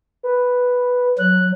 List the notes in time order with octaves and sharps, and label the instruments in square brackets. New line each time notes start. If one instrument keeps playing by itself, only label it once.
[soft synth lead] B4
[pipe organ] F#3 [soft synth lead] F#6